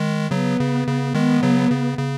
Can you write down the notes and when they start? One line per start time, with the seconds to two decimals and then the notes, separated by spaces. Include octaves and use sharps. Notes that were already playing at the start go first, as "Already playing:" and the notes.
Already playing: D#3 G#3
0.31 C#3 F#3 B3
0.59 C#3
0.88 C#3
1.15 D#3 G#3 B3
1.43 C#3 F#3
1.70 C#3
1.98 C#3